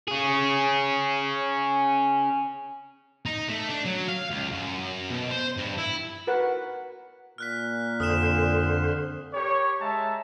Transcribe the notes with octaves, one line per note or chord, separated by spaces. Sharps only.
C#4 G#4
D#4
A3
D4
F#3
F5
C#2
F#2
B2
C5
G2
E4
F#4 A#4 B4 F#5
A#2 F6 F#6 B6
F2 D3 C5 D#6 F6 E7
G4 A#4 C#5
G#3 E5 A5 A#5